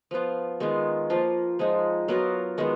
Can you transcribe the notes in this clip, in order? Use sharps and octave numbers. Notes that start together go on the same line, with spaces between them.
F3 B3 F4
D#3 G#3 B3 F4
F3 A#3 F4
F3 G#3 D#4
F#3 B3 F4 A#4
D#3 G#3 B3